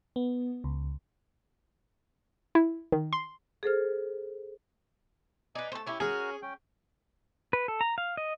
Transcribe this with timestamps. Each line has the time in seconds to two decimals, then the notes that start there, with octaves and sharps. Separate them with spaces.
0.16 B3
0.64 C#2
2.55 E4
2.92 D#3
3.13 C6
3.63 G#4 A4 C5 F6
5.55 D#4 B4 D5 G#5
5.72 A3 A4 C5
5.86 C#4 E4 G4
6.00 C#4 F#4 G#4 A#4
6.42 C#4 G5
7.53 B4
7.68 A4
7.81 A#5
7.98 F5
8.17 D#5